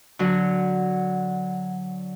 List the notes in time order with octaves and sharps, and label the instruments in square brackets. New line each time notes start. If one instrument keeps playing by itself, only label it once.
[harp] D3 F#3